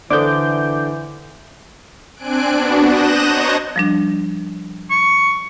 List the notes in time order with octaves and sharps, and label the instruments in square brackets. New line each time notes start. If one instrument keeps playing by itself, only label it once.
[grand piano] D3 [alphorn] E3 [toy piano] A4 C5 D5 [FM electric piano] D6 G6
[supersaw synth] C4 D4 G#5 F#6 D7
B3 D4 F#4
D#6 F#6 G6 A#6 D#7 E7
C5 C#5 D#5 A5 A#5 C#6
[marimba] F3 G3 D4
[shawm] C#6